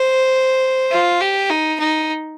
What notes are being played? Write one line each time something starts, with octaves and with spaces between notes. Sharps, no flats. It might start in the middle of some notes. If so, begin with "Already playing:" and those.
Already playing: C5
F4
G4
D#4
D#4